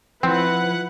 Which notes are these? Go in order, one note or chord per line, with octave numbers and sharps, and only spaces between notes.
F3 C4 E4 B4 F#5